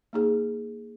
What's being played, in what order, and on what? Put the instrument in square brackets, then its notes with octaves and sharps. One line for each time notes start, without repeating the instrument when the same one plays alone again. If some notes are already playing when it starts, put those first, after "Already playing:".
[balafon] A#3 D#4 G#4